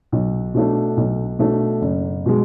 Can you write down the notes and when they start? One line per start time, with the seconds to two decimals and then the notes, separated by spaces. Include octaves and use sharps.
0.12 B1
0.54 B2 A3 D4
0.97 B1
1.39 B2 A3 D4
1.81 F#1
2.26 B2 G#3